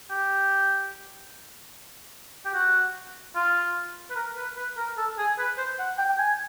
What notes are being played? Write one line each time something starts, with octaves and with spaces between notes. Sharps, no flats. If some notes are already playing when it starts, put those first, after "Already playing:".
G4
G4
F#4
F4
B4
A#4
B4
B4
A#4
A4
G#4
B4
C5
F#5
G5
G5
G#5